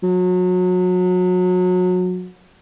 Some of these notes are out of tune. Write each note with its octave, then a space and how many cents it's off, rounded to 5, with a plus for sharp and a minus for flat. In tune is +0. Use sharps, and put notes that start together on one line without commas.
F#3 -30